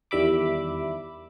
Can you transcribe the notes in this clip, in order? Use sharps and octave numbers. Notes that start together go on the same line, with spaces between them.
E2 D#3 G3 E5 B5 D6